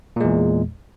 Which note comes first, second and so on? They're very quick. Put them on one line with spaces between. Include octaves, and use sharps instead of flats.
A#2 G#3 E2